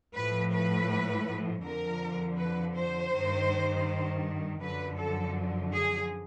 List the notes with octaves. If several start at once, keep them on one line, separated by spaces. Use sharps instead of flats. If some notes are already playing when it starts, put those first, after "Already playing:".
A2 F3 B4
B4
F2 D3 F3 A#4
B4
C5
G2 D#3
F#2 D3 F3 B4
A4
G#4